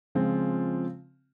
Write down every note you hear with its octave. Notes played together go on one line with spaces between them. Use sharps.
C#3 F3 G#3 C4 F4